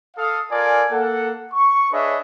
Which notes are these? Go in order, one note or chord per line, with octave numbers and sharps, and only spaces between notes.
A4 F5 D#6
F4 A4 A#4 D5 G#5
A#3 A4 F#5
C#6
D4 G#4 B4 C#5 D#5 E5